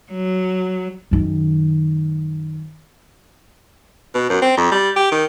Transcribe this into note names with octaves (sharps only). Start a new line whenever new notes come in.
F#3
F#2 D#3
B2
F#2
C4
F2
G3
G4
D#3